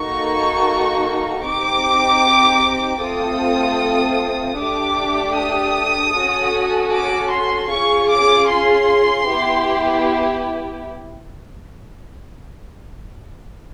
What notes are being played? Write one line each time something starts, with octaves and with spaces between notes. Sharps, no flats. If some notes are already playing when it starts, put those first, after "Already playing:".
Already playing: A#3 D#4 F#4 A4 C#6
C4 D#4 G4 D6
A3 C4 F4 A4 D#6
A3 D4 G4 D6
D#6
C#4 F#4 A4
D6
C6
C#4 F4 G#4 C#6
D6
C6
B3 E4 G4